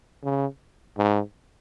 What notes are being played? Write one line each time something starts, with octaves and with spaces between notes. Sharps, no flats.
C#3
G#2